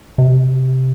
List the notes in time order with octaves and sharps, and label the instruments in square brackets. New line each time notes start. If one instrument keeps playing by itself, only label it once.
[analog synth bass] C3